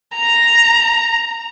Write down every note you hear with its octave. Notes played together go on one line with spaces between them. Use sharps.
A#5